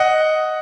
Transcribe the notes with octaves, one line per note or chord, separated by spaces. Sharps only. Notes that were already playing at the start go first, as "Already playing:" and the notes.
Already playing: D#5 F#5